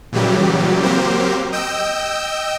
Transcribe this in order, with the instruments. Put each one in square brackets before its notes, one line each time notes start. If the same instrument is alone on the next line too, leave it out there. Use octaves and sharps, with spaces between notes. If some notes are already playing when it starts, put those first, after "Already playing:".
[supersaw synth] A#2 C#3 E3 F#3 G3 G4
F#3 A#3 C4 G4 A#4 C5
D#5 G5 E6 G6